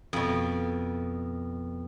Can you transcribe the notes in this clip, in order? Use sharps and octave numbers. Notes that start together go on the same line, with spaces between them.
F2 B2